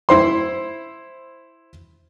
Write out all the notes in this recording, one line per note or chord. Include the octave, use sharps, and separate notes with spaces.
E4 C5 C6